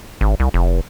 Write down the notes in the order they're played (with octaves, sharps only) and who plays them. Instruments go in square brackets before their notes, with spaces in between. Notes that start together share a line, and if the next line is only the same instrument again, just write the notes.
[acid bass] G#1
C2
F1